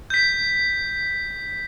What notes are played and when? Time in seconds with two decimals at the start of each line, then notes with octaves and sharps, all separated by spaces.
0.10 G6 B6